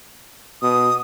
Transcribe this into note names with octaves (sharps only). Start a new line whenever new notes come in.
B2 D#6